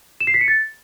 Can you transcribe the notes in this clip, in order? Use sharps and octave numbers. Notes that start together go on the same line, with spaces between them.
E7
C7
B6
C#7
A6